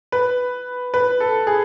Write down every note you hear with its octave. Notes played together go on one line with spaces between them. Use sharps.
B4
B4
A4
G#4